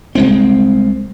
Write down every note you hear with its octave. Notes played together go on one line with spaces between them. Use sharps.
C2 G#3 C4